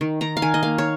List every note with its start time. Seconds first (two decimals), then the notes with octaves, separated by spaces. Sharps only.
0.01 D#3
0.21 D#3 A#5
0.37 F5
0.42 D#3 G#5
0.54 D#5
0.63 A#3 F5
0.78 C#5